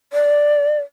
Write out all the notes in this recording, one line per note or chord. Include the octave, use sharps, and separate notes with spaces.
D5